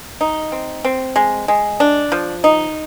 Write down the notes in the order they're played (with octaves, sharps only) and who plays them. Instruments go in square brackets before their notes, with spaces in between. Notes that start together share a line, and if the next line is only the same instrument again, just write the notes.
[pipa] D#4
C4
C4
G#3
G#3
D4
F3
D#4